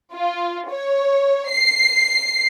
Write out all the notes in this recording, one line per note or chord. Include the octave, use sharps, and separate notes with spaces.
F4
C#5
C7